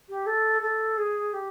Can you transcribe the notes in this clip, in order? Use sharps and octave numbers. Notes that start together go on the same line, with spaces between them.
G4
A4
A4
G#4
G4